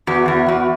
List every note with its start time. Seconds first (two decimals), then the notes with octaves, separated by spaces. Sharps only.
0.07 E2 F#4
0.28 E2
0.48 E2